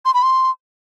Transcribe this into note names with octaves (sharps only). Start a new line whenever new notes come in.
C6
B5
C6